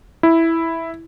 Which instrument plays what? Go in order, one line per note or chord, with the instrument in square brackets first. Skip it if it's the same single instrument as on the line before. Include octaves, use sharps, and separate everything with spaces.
[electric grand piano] E4